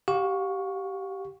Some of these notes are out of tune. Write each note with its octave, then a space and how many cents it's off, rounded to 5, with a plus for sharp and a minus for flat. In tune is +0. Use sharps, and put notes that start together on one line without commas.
G4 -15 F5 +35 C#6 +0